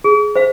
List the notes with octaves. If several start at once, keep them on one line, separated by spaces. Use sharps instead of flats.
G#4
C5 F5